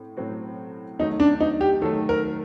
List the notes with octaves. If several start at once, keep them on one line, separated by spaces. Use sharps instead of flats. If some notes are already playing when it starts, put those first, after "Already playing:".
Already playing: A2 C4
A2 F#3 C4 F#4
D#3 F#3 A3 D#4
D4
D#4
G4
D#3 F#3 A3 A4
A#4